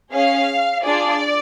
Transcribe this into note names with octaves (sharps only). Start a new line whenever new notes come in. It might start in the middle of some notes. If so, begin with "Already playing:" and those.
C#4 G#4 F5
D4 F4 G#4 D5